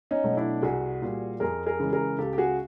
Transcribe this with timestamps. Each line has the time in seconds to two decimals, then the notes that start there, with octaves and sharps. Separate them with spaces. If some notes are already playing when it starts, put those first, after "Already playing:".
0.11 C#4 D#4
0.24 B2 F#3 A3
0.37 D4 E4
0.63 C2 F#4 G#4
1.02 A#2 G3
1.40 F2 G#4 A#4
1.66 G#4 A#4
1.80 C#3 E3 G#3
1.93 G#4 A#4
2.19 C#2 G4 A4
2.33 G4
2.38 F#4 G#4